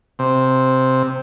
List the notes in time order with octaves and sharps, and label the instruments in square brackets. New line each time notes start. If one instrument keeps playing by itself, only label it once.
[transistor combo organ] C3